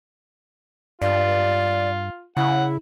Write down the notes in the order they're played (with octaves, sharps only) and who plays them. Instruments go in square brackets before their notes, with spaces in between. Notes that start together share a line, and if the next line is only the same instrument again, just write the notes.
[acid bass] G2 [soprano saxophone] F4 [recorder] D5
[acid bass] C#3 [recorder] E4 [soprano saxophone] F#5